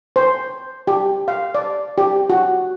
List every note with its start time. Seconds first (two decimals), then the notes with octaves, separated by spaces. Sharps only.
0.16 C5
0.87 G4
1.28 F5
1.55 D5
1.98 G4
2.30 F#4